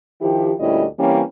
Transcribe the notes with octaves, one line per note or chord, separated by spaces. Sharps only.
D#3 F3 E4 G4
D2 A#2 G3 C#4 E4 D#5
E3 G3 A#3 C4 C#4